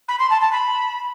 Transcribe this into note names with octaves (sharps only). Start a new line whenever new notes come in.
B5
C6
A5
A5
B5